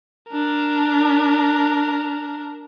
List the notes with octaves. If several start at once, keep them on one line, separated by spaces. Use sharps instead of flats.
D4 A#4